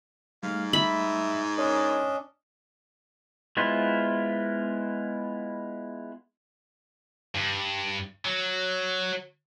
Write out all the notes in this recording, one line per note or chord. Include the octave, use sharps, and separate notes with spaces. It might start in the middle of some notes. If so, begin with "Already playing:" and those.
G#2 G3 A3 F5
E5 B5
C#4 D4 A#4 D5 D#5 C6
G#3 B3 E4 F4 C5
G2
F#3